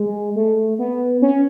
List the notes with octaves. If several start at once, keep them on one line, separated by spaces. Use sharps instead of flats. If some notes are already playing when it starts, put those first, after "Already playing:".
Already playing: G#3
A3
B3
C#4